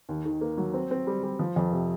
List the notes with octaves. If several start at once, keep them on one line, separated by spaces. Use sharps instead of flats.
D#2
D#3
A#3
F#3
C4
C4
G3
G3
F3
F2
C3